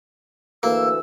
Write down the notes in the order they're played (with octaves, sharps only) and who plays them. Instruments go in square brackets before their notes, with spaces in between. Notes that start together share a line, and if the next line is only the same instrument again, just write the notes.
[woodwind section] D2 E3 E6 [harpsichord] A#3